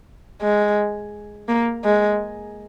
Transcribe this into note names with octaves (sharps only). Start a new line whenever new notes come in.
G#3
A#3
G#3